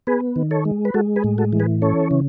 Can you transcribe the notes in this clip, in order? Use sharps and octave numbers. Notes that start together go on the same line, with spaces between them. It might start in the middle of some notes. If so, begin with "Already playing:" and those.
B3 G#4 B4
D#3
A4 C#5
G#3
B4
G#3 F#4 A4
G#4 B4
A2
F#4 A4
E3
G#4 B4
C#4 A4 C#5
C#3